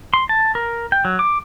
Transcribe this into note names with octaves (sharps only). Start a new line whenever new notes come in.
C6
A5
A#4
G5
F#3
D6